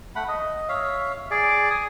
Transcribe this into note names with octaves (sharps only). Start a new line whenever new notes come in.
A3 F#5 B5
D#5
C#5 E5 F5
G#4 D5
G#5 D#6